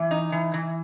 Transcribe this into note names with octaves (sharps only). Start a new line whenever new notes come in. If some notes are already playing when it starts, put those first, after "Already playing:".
Already playing: E3
D#4
E3
E3